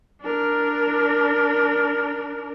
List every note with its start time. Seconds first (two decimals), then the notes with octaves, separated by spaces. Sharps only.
0.21 D4 A#4